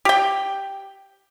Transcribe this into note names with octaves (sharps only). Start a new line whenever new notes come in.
G4 G5